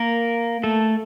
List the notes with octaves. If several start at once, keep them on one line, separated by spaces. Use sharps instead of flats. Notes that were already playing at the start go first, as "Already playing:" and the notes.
Already playing: A#3 A#4
A3 A4